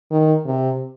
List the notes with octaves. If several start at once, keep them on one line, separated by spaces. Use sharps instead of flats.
D#3
C3